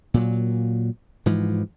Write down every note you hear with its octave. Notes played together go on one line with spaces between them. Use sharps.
A#2 F#3
G#2 E3 F3